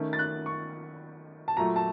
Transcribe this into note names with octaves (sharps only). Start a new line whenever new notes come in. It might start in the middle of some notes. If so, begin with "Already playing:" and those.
Already playing: D#3 A3 C#4
A6
F#6
C#6
A5
A#2 F#3 A3 A#5
A5